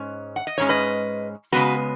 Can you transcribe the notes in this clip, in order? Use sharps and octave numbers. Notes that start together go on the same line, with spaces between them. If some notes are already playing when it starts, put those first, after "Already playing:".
Already playing: G#2 G#3 C#4
F#5
D#5
G#2 G#3 C#4 C#5
B4 D#5
C#3 G#3 B3 F#4 B4